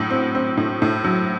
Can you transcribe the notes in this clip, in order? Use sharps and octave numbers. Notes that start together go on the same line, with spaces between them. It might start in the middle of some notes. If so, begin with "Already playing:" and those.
Already playing: A2 F#3
C4
C4
A2
A2
F#3